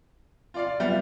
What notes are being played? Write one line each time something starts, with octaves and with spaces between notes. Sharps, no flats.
F4 D5 F5
G3 B3 E5